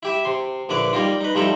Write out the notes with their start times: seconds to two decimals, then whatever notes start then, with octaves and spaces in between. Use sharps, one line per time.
0.03 E4 G4 E5
0.25 C3 C6
0.69 A#1 D3 E4 B4 D5
0.93 G3 A#3 D#4 F4
1.21 D#4 B4
1.35 C3 F3 G3 D#4 E4 A4